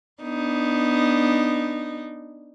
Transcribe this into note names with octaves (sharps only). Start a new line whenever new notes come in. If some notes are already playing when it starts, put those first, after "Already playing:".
B3 D4 D#4